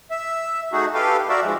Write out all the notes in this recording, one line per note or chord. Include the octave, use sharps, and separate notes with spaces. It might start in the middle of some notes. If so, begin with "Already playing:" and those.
E5
A3 D#4 F#4 G#4
G4 A4 B4 F5
F#4 A#4 D5 E5
G#2 F3 G#3